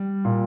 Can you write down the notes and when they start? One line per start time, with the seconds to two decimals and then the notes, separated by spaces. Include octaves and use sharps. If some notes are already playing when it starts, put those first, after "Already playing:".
Already playing: G3
0.25 A#2